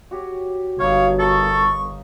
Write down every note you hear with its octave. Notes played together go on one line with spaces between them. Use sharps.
F#4 G4 C#5
G1 F#3 D#4 C#5 F5
A4 A#4 F5 C#6 D#6